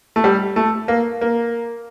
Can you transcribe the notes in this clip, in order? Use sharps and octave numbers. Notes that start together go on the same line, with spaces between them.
A3
G3
A3
A#3
A#3